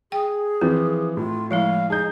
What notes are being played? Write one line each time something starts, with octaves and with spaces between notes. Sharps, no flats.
G#4 G5
E3 F3 C4
A2 F4
F3 G#3 E4 F5
D#4 G#4 G6